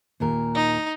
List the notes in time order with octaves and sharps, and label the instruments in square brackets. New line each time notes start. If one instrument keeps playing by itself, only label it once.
[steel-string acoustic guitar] D#2 A#2 A#4
[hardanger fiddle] D#4